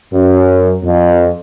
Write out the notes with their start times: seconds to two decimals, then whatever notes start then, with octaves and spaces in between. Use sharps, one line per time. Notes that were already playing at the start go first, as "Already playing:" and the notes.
0.13 F#2
0.83 F2